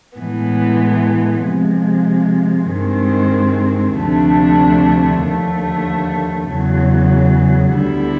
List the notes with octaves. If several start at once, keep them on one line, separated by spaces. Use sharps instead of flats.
A2 E3 G#3 B3
C3 F3 G#3
G2 D#3 G#3 C4
D2 C3 F3 A3 D4
D#2 D3 F3 A3
E2 C#3 F#3
D2 D3 G3 B3 E4